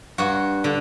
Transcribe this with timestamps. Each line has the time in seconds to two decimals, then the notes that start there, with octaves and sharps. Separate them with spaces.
0.18 G2 F#4
0.64 D3